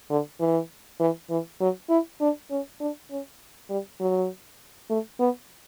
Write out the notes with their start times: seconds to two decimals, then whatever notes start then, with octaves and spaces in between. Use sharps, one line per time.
0.10 D3
0.40 E3
1.00 E3
1.30 E3
1.60 F#3
1.90 E4
2.21 D4
2.51 C#4
2.80 D4
3.11 C#4
3.69 G3
4.00 F#3
4.90 A3
5.20 B3